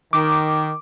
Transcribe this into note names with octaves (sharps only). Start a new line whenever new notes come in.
D#3 D6